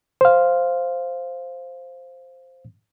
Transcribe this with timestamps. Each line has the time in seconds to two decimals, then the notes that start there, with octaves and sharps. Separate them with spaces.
0.21 C5 F5